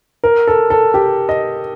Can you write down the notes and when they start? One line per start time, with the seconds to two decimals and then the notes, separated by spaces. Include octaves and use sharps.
0.24 A#4
0.47 A4
0.70 A4
0.94 G4
1.29 D#5